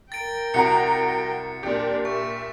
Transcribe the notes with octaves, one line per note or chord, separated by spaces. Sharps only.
A#4 G5 A6 D7
C2 F#4 A#5 C#7
A#2 D4 G4
E5 C#6